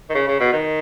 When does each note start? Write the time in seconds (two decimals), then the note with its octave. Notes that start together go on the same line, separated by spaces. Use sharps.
0.09 D#3
0.14 C#3
0.27 C#3
0.40 B2
0.52 D#3